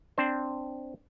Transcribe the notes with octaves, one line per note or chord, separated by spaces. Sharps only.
C4 D4 C5